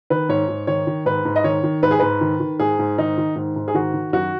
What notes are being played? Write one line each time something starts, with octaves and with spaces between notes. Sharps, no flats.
D#3 B4
G#2 C#5
G#2
D#3 C#5
D#3
G#2 B4
G#2
D#5
D#3 C#5
D#3
G#2 B4
G#4
G#2 B4
D#3
D#3
G#2 G#4
G#2
D#3 D#4
D#3
G#2
G#2
G#4
D#3 F#4
D#3
F#2 F#4